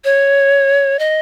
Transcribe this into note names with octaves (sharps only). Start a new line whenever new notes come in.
C#5
D#5